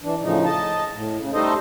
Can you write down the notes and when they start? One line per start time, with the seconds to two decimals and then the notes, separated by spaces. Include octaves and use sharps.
0.03 E3 D4
0.22 A2 C#3 F3 D#4
0.45 D#5 A5
0.94 A2
1.17 C#3
1.33 G3 A3 D#4 A4 C5 D#5